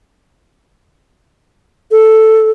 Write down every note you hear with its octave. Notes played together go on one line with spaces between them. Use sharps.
A4